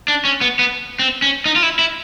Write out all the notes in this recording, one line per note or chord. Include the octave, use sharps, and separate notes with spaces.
D4
C#4
B3
B3
C4
C#4
D#4
F4
E4
E4